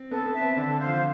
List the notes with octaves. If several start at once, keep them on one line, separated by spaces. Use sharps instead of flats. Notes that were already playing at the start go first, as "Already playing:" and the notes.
Already playing: C4
B3 A4
B3
E5 A5
C4
D3 D4 A4
C5 F5
F3 F4